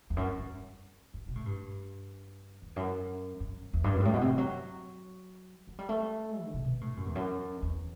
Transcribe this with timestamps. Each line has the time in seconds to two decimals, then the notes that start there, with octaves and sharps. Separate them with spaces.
0.10 E2
0.17 F#2
0.38 G2
1.14 G2
1.28 B2
1.36 A2
1.46 G2
2.62 E2
2.76 F#2
3.40 F#2
3.73 E2
3.84 G2
3.95 F#2
4.00 G2
4.05 A2
4.13 B2
4.21 C3
4.30 E3
4.38 F#3
5.67 F#3
5.79 G3
5.89 A3
6.43 D3
6.54 C3
6.65 B2
6.81 A2
6.97 F#2
7.06 E2
7.15 F#2
7.62 E2